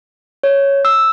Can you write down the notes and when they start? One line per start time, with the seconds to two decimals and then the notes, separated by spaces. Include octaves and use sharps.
0.44 C#5
0.85 E6